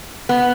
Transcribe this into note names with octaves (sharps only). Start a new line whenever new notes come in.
B3